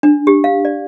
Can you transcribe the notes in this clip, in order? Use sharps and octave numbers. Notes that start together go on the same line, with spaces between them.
D4
G4
F5
D5